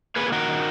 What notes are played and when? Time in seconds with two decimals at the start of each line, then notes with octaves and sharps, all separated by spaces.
0.16 A#3 G#4 B4
0.26 G#4
0.32 D#3 F#4 A#4
0.48 D#3